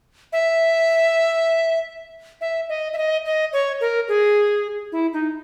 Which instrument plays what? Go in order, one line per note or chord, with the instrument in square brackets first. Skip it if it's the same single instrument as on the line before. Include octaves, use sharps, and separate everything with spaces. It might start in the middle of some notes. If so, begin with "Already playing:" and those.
[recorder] E5
E5
D#5
E5
D#5
D#5
C#5
A#4
G#4
E4
D#4